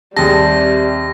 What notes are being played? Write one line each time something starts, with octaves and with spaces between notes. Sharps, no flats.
D#2 C3 G3 G#4 A5 A#6